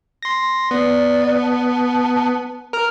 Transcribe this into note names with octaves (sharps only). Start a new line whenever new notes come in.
C6 A#6
B3 D5
A5
A#4 F6